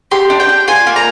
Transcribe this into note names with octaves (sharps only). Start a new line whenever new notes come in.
G4 C6
D4
G5
D4
F4 G#5
A#3
A#5